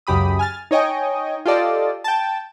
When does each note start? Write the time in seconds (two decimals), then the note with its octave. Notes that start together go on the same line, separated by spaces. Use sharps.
0.07 C#2 F#2 C#3 G4 B5 D#6
0.39 G#5 F6 A6
0.71 D#4 C#5 D#5 G5 G#5
1.46 F4 G4 A4 D5 D#5
2.04 G5 A5